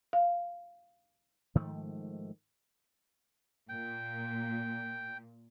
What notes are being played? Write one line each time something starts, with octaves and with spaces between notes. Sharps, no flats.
F5
G#2 D#3 F3 A3
A#2 G5